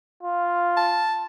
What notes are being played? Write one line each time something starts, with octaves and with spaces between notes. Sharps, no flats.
F4
A5